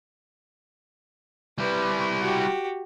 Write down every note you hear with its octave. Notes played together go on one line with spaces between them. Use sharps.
G3 E4 B4
F#4 G4